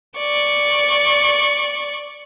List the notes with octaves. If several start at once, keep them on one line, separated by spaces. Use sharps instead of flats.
D5 C#6